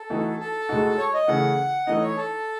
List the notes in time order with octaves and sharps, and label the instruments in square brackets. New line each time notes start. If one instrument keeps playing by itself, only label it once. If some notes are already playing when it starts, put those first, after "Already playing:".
Already playing: [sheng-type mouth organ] A4
[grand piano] E3 A3 D#4 F#4
[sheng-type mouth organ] A4
[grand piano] A2 G#3 D#4 F#4
[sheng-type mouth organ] C#5
D#5
[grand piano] C#3 E3 A3 [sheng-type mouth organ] F#5
[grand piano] E3 A3 D#4 [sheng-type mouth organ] D#5
[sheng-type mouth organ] C#5
A4